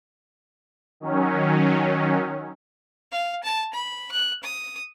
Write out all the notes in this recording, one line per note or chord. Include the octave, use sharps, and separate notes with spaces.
D#3 F#3 C#4
F5
A5
B5
F#6
D#6